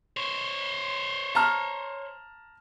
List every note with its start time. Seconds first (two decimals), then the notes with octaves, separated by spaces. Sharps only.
0.17 C5 C#5
1.35 A5 A#5 F6